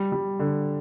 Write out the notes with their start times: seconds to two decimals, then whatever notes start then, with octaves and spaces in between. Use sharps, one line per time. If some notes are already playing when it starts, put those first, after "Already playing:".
Already playing: G3
0.12 G3
0.39 D3